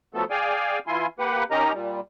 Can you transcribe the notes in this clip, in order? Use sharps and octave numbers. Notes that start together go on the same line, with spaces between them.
F3 F#3 A3 B3 A4
G#4 D5 F5 G5 G#5
E3 E4 F4 G#5 C6
A#3 G4 B4 F#5
C#4 D#4 G4 A#4 D#5 A#5
A#2 G3